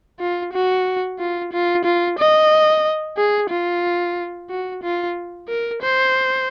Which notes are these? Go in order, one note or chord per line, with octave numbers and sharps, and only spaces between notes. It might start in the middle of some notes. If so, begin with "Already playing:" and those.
F4
F#4
F4
F4
F4
D#5
G#4
F4
F#4
F4
A#4
C5